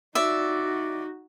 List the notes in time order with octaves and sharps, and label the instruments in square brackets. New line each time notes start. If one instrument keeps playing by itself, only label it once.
[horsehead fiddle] D#4 F#4 [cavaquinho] D5 E5